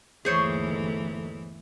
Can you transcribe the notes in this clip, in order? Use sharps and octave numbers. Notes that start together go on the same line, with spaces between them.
G1 D#2 E3 A3 G#4 C5 C#5